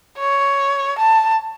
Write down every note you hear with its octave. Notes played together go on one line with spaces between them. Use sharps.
C#5
A5